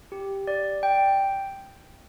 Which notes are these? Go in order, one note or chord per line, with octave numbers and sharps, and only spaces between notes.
G4
D5
G5